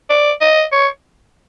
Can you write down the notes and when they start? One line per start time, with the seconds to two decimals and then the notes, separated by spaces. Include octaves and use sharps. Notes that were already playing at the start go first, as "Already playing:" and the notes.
0.09 D5
0.41 D#5
0.72 C#5